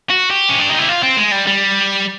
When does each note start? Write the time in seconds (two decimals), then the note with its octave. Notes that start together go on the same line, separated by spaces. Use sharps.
0.10 F#4
0.31 G4
0.49 C#4
0.59 D4
0.69 D#4
0.78 E4
0.89 F4
1.03 C4
1.17 G#3
1.32 G3
1.47 G3